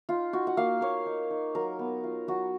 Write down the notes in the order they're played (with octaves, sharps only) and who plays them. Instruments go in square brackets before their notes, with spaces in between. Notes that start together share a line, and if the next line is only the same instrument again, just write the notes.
[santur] D#4 F4
D#4 F#4
F#5
A#3 F5
A#3 C#5
D#4
D#4
F#3 A#4
B3
F4
F#3 F#4